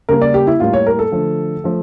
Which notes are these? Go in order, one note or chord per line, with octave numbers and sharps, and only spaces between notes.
C#3 G3 A#3 A#4
D5
G4
E4
A2 G3 A#3 F4
C#5
A#4
A4
D3 F3 A3
F3 A3